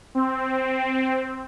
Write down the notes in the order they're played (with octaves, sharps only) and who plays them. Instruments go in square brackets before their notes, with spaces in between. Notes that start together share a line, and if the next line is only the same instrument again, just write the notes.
[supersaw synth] C4